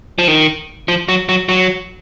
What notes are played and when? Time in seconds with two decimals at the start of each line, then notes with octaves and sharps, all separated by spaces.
0.19 F3
0.28 D#3
0.88 F3
1.08 F#3
1.29 F#3
1.49 F#3